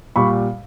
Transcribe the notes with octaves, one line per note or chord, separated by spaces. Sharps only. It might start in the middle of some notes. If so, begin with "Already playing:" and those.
A#2 G3 B5 C#6